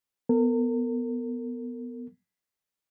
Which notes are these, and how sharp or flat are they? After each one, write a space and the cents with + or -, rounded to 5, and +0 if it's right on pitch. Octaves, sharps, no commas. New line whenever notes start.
B3 +0 A#4 -40